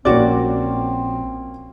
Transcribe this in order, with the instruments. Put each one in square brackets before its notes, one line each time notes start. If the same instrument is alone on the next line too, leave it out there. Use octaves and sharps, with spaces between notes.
[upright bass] A#1 [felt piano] A#3 C#4 [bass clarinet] C4 [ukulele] F#4 D5